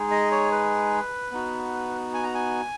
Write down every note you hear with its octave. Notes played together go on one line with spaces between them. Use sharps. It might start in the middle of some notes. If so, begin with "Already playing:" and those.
Already playing: G#3 D#4 G#4
D#5
C#5
B4
B3 D#4 F#4
G#5
A#5
G#5